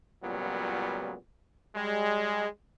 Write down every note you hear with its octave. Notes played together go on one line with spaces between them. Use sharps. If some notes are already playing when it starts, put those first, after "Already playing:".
C#2 A#2 F#3 G3 B3
G3 G#3